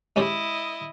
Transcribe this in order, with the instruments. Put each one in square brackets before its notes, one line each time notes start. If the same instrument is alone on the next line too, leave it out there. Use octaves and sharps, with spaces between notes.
[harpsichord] G#3 C#4 G4 [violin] E4 D#5